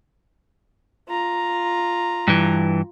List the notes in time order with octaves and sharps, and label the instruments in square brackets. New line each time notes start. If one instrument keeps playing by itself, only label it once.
[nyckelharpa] F4 A#5
[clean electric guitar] G2 E3